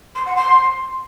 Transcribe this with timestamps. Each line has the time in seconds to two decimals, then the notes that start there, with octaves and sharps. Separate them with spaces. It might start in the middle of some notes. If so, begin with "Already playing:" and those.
0.15 C6
0.26 F#5
0.36 C6